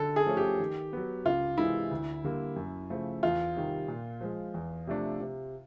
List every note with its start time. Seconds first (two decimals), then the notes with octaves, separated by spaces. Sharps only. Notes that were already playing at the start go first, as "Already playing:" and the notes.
Already playing: D3 A4
0.16 G#4
0.26 F3 A3 C#4
0.37 G4
0.60 D#3
0.93 F#3 B3
1.25 C#2 F4
1.58 C3 E3 G#3 E4
1.91 D2
2.24 D3 G3 A#3
2.56 F#2
2.90 C#3 F3 A3
3.23 E2 F4
3.56 C3 D#3 G3
3.88 A#2
4.21 F3 G#3
4.54 E2
4.87 C3 F3 A3 D4
5.20 C3